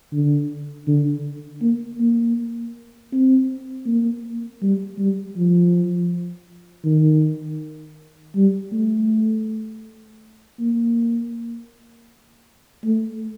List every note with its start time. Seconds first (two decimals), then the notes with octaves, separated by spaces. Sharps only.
0.13 D3
0.87 D3
1.62 A#3
2.00 A#3
3.12 C4
3.86 A#3
4.62 G3
4.99 G3
5.37 F3
6.85 D#3
8.36 G3
8.72 A3
10.60 A#3
12.84 A3